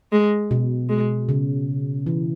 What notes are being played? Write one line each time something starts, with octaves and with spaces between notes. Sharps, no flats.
G#3
B2
G#3
C#3
E3